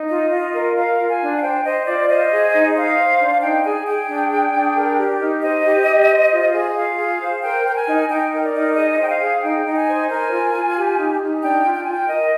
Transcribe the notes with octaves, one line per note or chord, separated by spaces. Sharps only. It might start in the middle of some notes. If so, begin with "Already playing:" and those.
Already playing: D#4
F4 D#5
F4
A#4
A#4 F5
F4
G#5
D4
F5
C5 G5
C5 D#5
F4 D5
C5 D#5
G#4
D#4
C5 F5
C5
D4
D#4 G5
G#4 G#5
G#4 G5
D4
G#4
D4
A#4
G4
D#4
C5 D#5
G4
G4
C5
F4
G#4
F4 F5
G#4
C5
A#4 G5
A#4 G5
G#5
D#4
D#4 G5
A#4
D5
D#4
G#4 D#5
C5 G5
F5
G#4
D#4 G5
D#4
G#5
C5
A#4 G#5
F4
F4
G4
D#4
D#4
D4 G5
F4
G5
F4 G#5
G5
A#4 D#5